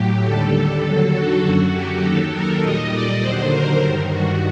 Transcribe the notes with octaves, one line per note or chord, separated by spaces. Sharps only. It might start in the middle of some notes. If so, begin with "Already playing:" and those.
Already playing: A2 F#3 G4
D#2 D3 G3 A4
D#2 D3 F#3
F#4
F#2 F#3 F#4
G4
D#2 D#3 F#3 A4
A#4
A#2 G3 D#5
D5
D#2 D3 F#3 C5
A#4
G2 D#3 G3
F#4